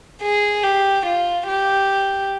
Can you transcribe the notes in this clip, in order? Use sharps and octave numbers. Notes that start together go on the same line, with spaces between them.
G#4
G4
F4
G4